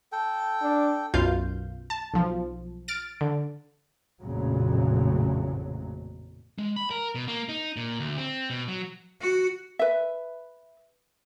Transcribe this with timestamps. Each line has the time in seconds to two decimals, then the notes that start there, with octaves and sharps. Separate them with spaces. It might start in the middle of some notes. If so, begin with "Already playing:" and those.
0.12 A4 G5
0.62 D4
1.14 B1 F#2 B2 F4 F5 G6
1.90 A5
2.13 B1 F3
2.88 F6 A6 D7
3.21 D3
4.20 A1 F2 A#2 C#3 F#3
6.58 G#3
6.76 B5
6.90 A#4
7.15 B2
7.28 A#3
7.49 D#4
7.76 A#2
8.00 D2
8.18 C4
8.50 B2
8.68 F#3
9.21 F#4
9.79 B4 E5